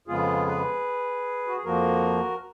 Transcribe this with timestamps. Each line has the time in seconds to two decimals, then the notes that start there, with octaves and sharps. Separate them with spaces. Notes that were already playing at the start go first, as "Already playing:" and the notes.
0.07 F2 C#3 G#3 B3 F4 G#4
0.47 G#4 B4
1.47 F#4
1.56 G#4
1.65 F2 F3 A#3 F#4 A#4